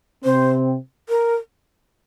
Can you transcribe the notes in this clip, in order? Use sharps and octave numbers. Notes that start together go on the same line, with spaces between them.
C3 C4 C5
A#4